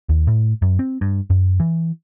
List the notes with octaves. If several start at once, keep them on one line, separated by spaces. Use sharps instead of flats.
D#2
A2
F#2
C4
G2
F#2
E3